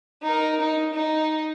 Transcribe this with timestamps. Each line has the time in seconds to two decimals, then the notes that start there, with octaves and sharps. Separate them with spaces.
0.22 D#4 A#4
0.60 D#4
0.94 D#4